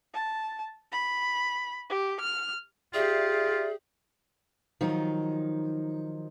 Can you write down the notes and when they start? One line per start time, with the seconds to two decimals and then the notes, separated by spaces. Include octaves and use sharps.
0.14 A5
0.92 B5
1.89 G4
2.20 F6
2.94 F4 G4 G#4 D5 E5
4.81 D#3 F3 F#3 D#4